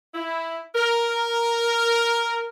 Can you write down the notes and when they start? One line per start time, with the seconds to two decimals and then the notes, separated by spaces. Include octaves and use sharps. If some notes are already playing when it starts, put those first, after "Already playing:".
0.14 E4
0.75 A#4